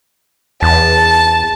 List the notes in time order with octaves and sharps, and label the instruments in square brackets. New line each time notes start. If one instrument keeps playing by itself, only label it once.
[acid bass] E2 [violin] A5